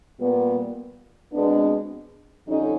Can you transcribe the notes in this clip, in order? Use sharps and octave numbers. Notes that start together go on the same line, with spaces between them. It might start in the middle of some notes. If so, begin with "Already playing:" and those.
A#2 G3 B3
B2 G#3 B3 C4 D4
F2 D3 G3 C#4 D#4